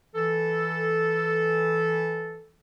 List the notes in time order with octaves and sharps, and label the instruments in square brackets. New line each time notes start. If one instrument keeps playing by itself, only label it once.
[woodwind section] E3 A4